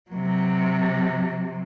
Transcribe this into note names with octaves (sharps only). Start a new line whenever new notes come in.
C3 F#3